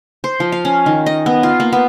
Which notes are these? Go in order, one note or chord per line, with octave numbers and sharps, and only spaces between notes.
C5
F3
F5
C#4
D#3
D#5
B3
F4
A#3
B3